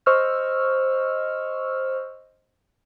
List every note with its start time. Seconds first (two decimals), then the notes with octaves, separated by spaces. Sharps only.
0.06 C5 D#5 C#6 E6 F6